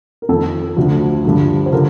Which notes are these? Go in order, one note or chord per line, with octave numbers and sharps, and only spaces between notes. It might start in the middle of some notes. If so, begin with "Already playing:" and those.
A#4
F2 D#3 A4
D2 D3 F3
G2 D3 F3
C5
D3 F3 A#4